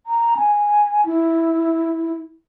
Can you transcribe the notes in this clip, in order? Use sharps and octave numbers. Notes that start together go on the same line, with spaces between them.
A#5
G#5
E4